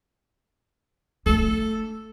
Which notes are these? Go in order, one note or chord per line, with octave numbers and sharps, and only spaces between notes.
A3 D4 A4